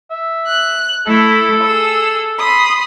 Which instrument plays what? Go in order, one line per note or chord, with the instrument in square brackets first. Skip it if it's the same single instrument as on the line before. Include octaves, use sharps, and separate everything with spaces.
[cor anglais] E5
[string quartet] F#6
[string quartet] A3 E4 [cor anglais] A4
[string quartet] G#4 E6
B5 C6 D#6